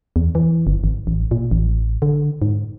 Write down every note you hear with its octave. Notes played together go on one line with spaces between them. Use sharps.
E2
E3
G1
G#1
A1
A#2
A1
D3
G#2